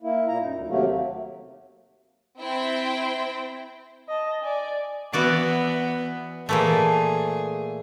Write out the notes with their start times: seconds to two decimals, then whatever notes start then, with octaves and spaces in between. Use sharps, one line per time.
0.02 A#3 E4
0.28 A#2 A#5
0.42 F#2 D#4
0.55 D2
0.68 D#2 C3 F#3 A3 A#3
2.38 C4 E4 G5
4.09 D#5 A5
4.41 D5 G#5
5.13 E3 B3 F#4 D5
6.49 A#2 E3 A3 G#4